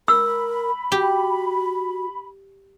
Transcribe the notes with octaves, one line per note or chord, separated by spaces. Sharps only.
A#4 B5 E6
F#4 G4